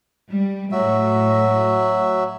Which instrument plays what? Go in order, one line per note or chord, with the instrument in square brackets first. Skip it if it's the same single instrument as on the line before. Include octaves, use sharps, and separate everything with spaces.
[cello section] G3
[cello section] A2 [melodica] F#3 F#4 E5